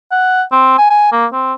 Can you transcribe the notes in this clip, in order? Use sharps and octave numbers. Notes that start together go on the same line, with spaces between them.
F#5
C4
G#5
G#5
A#3
C4